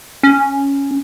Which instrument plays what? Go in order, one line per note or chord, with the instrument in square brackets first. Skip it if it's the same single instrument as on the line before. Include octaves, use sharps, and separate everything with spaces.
[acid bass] C#4